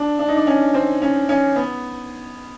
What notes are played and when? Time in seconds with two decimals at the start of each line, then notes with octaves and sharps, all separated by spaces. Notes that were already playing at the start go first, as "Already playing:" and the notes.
Already playing: D4
0.19 D4
0.28 D#4
0.37 D4
0.47 C#4
0.74 C4
1.02 C#4
1.29 C#4
1.56 B3